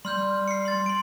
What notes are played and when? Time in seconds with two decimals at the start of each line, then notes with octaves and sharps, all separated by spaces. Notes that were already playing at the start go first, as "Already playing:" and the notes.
0.05 G3 C6 F6 G6
0.48 C7 C#7
0.65 C6 A6
0.86 C6 D7